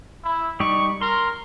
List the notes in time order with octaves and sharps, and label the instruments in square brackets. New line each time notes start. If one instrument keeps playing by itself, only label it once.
[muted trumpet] E4
[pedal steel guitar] G3 D#4 D5 [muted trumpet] C#6
[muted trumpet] A#4 [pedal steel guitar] C6